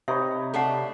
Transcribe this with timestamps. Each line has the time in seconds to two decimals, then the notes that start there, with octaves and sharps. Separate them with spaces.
0.08 C3 D#4 B4 C#5 E5
0.54 A3 D4 A4 F#5